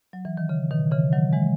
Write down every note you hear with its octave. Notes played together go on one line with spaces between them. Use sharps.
F#3
E3
D#3
C#3
B2 D#3
C#3 E3
D#3 F#3
E3 G#3